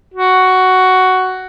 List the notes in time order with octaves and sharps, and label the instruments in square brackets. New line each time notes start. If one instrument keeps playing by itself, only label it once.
[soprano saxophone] F#4